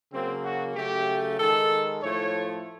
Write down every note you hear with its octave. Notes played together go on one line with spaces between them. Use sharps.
C#3 F#3 A#3 C4
F#4
C#3 F#3 A3 G4
D#3 G#3 A4
A2 F3 A3 C#5